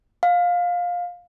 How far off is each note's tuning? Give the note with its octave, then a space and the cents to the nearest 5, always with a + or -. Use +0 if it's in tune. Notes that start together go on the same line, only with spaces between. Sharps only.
F5 +20